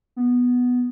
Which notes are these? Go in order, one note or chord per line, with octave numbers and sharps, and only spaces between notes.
B3